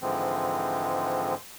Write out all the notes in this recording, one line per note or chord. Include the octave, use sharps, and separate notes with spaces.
G#2 D3 E3 F3 G#3 C4